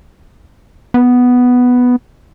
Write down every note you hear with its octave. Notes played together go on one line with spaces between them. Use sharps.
B3